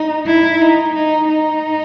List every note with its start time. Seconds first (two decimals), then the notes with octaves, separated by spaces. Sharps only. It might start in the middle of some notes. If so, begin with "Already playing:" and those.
Already playing: D#4
0.27 E4
0.61 D#4
0.95 D#4
1.29 D#4